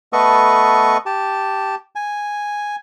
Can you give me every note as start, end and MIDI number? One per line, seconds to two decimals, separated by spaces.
0.13 0.97 57
0.13 0.97 59
0.13 0.97 69
0.13 0.97 71
0.13 0.97 75
0.13 0.97 85
1.06 1.75 67
1.06 1.75 81
1.95 2.76 80